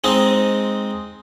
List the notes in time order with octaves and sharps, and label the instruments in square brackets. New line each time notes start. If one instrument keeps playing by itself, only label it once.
[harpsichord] G#3 C4 D#4